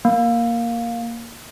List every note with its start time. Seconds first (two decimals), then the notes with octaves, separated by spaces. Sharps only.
0.05 A#3